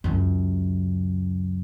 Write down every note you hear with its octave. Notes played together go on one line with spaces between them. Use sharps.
C#2 F#2